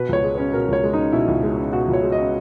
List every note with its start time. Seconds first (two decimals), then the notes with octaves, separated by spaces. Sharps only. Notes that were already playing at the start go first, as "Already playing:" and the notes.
Already playing: B2 B4
0.09 C#2 C#5
0.24 G#3
0.33 C#4 B4
0.53 B2 A#4
0.68 C#2 C#5
0.84 G#3
0.93 C#4 D#4
1.13 B2 E4
1.28 C#2
1.43 G#3
1.58 C#4
1.72 B2 F#4
1.88 C#2
1.93 C#5
2.02 G#3
2.12 D#5
2.19 C#4